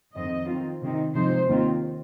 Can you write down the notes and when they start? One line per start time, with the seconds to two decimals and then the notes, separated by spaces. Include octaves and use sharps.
0.15 F2 D#3 C4 D#5
0.48 D#3 C4 F4
0.81 C3 D#3 C4 D#4
1.14 C3 F3 G#3 D#4 C5
1.47 D#2 D#3 C4 F4